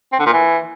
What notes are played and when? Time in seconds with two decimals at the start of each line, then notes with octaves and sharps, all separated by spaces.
0.13 C4
0.19 D3
0.26 A#2
0.33 E3